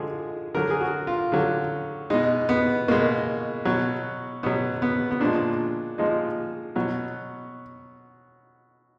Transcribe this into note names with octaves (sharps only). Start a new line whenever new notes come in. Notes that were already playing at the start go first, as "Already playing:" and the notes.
Already playing: D3 F3 G#3 G#4
D3 F#3 A#4
G#4
F#4
F4
D3 F#3
B2 G#3 D#4
B3
B2 G#3 A#3
B2 F#3
B2 F#3 B3
B3
B3
A#2 F3 G#3 D4
A#2 F3 G#3 D#4
B2 F#3